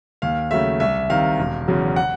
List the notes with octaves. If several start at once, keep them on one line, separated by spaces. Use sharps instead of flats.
D#2 F5
C#3 F#3 A3 E5
C2 E5
C3 D#3 F5
E1
E2 C#3 F#3
F#5